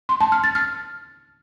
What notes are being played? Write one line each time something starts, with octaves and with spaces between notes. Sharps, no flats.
C6
A5
F6
A6
F6